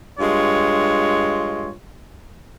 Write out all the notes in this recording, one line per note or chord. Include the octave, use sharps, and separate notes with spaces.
G2 G#3 F4 C#5